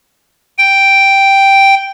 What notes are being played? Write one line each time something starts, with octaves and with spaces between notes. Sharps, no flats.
G5